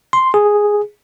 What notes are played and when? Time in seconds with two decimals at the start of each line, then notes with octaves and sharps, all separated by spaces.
0.13 C6
0.34 G#4